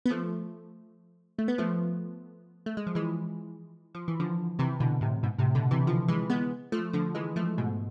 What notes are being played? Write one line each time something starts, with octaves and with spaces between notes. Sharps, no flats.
B3
F3 A3
A3
B3
F3 A3
A3
G#3
F3
E3 G#3
F3
E3
D3 F3
C3 E3
B2 D3
A2 C3
G#2 B2
A2 C3
B2 D3
C3 E3
D3 F3
E3 G#3
G#3 B3
F3 A3
D3 F3
E3 G#3
F3 A3
G#2 B2